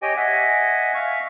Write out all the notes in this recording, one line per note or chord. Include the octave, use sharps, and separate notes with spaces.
G4 C#5 D#5 G5 G#5
D#5 E5 F#5 G#5
E5 F5 C#6